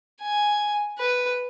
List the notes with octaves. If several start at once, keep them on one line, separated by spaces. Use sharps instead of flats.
G#5
B4